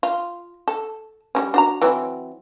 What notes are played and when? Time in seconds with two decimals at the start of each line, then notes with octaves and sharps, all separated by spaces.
0.03 F4
0.68 A4
1.35 G3 A#3 C#4
1.54 D4 F#4 A#5
1.82 E3 F#3 C4